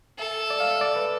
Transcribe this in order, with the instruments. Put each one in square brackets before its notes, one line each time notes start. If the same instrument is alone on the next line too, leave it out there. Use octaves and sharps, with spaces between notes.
[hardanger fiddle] A4 [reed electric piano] E5
[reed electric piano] D5
F5
E5
D5
B4